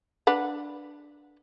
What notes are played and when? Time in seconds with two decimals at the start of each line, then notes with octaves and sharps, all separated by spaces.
0.27 D4 B4 F#5